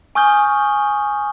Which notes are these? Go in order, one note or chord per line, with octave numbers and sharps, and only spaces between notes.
G#5 C#6 D#6 F6 G6 G7